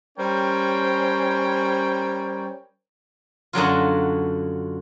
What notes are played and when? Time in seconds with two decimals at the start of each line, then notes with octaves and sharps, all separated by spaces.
0.18 G3 C#4 A#4 C5 C#5 G5
3.53 F#2 D3 F#3 F4